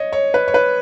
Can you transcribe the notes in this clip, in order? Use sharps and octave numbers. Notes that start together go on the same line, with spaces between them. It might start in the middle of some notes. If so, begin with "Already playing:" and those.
Already playing: C#5 D#5
C#5
B4
C#5
B4